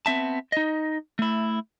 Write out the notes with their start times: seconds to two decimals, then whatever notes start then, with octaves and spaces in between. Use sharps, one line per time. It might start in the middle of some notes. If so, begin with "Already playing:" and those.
0.06 B3 C4 E5 A5
0.52 D#4 D#5
1.19 A3 E4